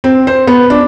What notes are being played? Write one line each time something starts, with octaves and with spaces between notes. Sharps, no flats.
C4
C5
B3
D4